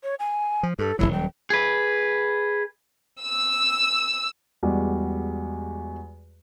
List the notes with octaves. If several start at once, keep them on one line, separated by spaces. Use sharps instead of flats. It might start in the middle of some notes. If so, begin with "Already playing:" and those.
C#5
G#5
F3
G2 A4
D#1 C#2 F#3 E4
G5
G#4 B4
E6
E2 G3 G#3 F#4 D5